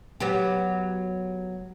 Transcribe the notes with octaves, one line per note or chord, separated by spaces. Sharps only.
F#3 B3 G4